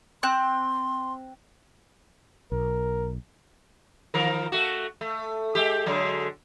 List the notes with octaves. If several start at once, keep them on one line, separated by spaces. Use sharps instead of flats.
C4 C6 F#6
B1 A#4
D#3 F3 A#4
A3 F#4
A3
G#3 G4
D3 F#3 G#3